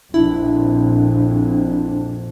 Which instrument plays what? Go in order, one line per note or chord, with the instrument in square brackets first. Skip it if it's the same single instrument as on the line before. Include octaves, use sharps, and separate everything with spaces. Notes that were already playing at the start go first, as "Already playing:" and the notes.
[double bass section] A#1 F2 [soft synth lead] D4 [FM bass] E4